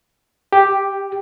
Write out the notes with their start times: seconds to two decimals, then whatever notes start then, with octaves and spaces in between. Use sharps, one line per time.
0.53 G4